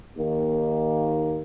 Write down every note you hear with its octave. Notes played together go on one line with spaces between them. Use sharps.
D#2 D#3 A#3